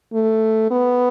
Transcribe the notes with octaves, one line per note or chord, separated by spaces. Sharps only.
A3
B3